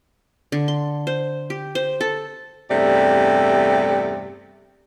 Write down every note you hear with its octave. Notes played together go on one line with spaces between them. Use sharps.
D3
C6
C5
G4
C5
A4
E2 G2 C3 A3 D5